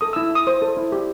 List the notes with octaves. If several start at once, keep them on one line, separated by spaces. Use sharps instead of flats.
A4 D#6
E6
E4
E4 D#6
C5 D#6
A4
E4
G4